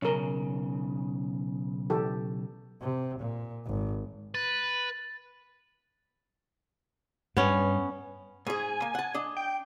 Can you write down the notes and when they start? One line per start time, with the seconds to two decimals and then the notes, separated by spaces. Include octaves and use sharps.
0.02 B1 C#3 C#4 A#4
1.90 E3 G4 A4
2.81 C3
3.19 A#2
3.66 G#1
4.35 B4 A6
7.37 G2 B3 C#4
8.47 G#2 G#4 G#5
8.82 A#3
8.95 F#5 A5
9.15 D4 D#5
9.37 G5